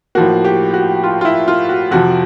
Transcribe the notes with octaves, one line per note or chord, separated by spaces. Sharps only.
A2 F3 A#3 F#4
G4
F#4
F4
F4
E4
F4
F#4
F2 C3 F3 F#4